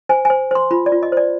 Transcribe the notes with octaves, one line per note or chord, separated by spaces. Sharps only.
C5 G#5
C5 G#5
C5 C6
F4 B5
D5
F4
D#5
C5 D5